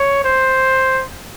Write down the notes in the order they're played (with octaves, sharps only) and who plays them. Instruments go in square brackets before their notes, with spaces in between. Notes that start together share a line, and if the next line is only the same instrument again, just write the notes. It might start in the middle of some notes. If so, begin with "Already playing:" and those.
Already playing: [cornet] C#5
C5